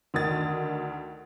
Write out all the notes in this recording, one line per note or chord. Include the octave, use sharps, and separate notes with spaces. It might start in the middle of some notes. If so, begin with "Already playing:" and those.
D2 D#3 D#6 A6